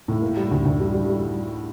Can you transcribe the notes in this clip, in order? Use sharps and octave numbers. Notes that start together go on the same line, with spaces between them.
A2
A#3
G3
D2
D2
G3
G3
G3